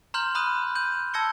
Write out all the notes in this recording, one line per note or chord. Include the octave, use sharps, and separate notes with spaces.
A#5 C6 F6 G6 F#7
A#5 B5 D#6 F#6 D#7
G6 D#7 F#7
A5 E6 G#6 A#6 C#7 G7